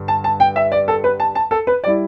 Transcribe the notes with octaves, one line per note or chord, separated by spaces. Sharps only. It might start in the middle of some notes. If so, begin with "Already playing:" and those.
Already playing: G2 D3 G3
A5
A5
G5
E5
D5
A4
B4
A5
A5
A4
B4
G3 E4 D5